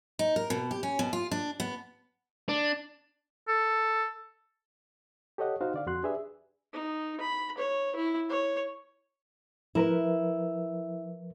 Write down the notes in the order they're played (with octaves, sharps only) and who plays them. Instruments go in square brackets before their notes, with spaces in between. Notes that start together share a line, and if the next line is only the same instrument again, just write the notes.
[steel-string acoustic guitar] D#4
A#4
B2
G4
C#4
B2
F4
D4
B3
[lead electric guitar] D4
[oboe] A4
[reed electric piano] G4 A4 C#5 D#5 F#5
D#4 F#4 C5 F5 F#5
D3 D5 F5
F2 F#4 C6 F#6
D4 G4 G#4 B4 D5 E5
[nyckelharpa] D#4
B5
C#5
E4
C#5
[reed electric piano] F3 A#4 B4 [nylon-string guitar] E4